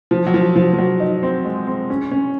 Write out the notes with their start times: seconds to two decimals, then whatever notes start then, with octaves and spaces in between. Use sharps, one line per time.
0.11 F3
0.27 F#3
0.34 F3
0.56 F3
0.73 F3
0.79 F#3
1.00 D#4
1.23 C4
1.45 G#3
1.67 C4
1.90 C#4
2.11 C#4